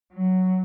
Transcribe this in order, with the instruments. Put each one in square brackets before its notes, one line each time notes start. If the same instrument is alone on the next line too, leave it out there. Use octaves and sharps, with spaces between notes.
[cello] F#3